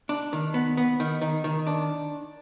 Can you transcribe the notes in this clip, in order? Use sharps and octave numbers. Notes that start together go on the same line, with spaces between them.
D4
D#3
B3
B3
D#3
D#3
D#3
D4